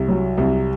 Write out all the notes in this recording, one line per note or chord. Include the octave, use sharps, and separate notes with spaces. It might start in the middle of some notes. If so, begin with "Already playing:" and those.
Already playing: C2
F#3
C2